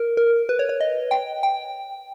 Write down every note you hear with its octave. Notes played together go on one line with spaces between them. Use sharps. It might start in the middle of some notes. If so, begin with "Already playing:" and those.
Already playing: A#4
A#4
B4
C#5
C#5
D#5
G5
G5